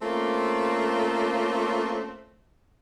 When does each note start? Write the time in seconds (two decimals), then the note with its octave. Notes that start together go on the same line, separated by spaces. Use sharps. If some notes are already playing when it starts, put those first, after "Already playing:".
0.02 A3 A#3 C4 C#4 F4